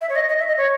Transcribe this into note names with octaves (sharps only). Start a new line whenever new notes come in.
E5
C#5
D#5
D#5
E5
D#5
C#5